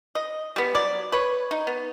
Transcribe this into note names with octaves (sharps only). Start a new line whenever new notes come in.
D#5
G3 B3
F#3 D5
B4 C#5
D#4
B3